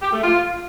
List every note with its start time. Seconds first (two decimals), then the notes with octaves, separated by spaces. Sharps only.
0.02 G4
0.13 A3
0.24 F4